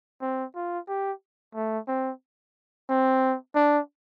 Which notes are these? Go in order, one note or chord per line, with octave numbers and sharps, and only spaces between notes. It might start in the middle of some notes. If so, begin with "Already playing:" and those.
C4
F4
G4
A3
C4
C4
D4